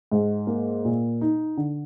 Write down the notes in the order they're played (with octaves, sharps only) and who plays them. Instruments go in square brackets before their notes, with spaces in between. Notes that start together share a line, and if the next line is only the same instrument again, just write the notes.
[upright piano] G#2
A#3
A#2
D#4
D3